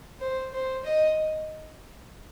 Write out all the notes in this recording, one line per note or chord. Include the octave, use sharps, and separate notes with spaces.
C5
C5
D#5